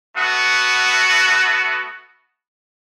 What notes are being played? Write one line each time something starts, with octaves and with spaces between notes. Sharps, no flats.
A3 B3 F#4